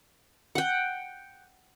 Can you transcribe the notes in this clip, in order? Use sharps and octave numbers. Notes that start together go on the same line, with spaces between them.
F#5 G5